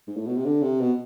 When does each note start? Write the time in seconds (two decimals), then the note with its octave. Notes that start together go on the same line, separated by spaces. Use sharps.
0.08 G#2
0.17 A2
0.26 B2
0.36 C3
0.45 D3
0.63 C3
0.81 B2